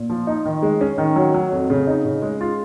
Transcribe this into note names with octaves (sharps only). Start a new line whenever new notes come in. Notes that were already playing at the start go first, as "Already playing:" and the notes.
Already playing: A#2
F3
D#4
D#3
G#3
C#4
D#3
F#3
F#3
F2
C#3
D#4
C#3
G#3
F4